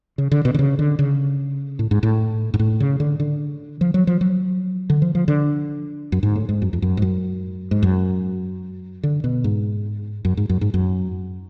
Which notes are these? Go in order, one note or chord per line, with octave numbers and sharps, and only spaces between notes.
C#3
D3
B2
D3
C#3
D3
C#3
A2
G#2
A2
G#2
A2
C#3
D3
D3
F3
F#3
F3
F#3
D3
F3
F3
D3
F#2
G#2
A2
G#2
F#2
F2
F#2
G#2
F#2
G#2
F#2
D3
B2
G#2
F#2
G#2
F#2
G#2
F#2